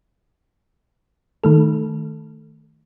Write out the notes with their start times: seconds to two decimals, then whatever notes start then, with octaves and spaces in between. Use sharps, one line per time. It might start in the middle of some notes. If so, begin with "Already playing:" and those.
1.44 D#3 A3 A4